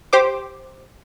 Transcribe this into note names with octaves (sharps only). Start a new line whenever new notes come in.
G4 C5 D6